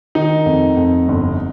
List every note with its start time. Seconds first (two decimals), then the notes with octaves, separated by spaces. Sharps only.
0.15 D#3 D#4
0.46 F2
0.77 F2
1.08 G1